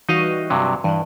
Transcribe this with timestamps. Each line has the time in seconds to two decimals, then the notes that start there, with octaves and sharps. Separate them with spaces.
0.09 E3 G3 D#4 F#4 D#5 F5
0.50 G2 C3 F#3
0.84 G2 E3 G3